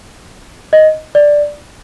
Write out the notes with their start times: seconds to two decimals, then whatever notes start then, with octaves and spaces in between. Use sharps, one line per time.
0.73 D#5
1.15 D5